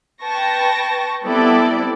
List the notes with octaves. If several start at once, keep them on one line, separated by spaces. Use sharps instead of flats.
B4 G5 A5 C#6 A#6
G3 B3 C4 E4 A4 D5